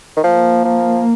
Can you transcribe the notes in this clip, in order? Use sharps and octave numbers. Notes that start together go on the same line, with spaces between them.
D#3
F3 A#3
F3